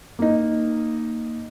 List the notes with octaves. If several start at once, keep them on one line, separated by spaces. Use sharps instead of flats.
A#3 D#4